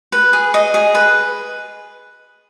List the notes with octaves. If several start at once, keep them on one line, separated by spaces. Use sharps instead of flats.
B4
G#4
D#5
G#4
B4